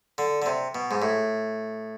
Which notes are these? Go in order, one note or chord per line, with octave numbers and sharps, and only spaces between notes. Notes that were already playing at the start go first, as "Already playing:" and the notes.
D3
D3
C3
B2
G#2
A2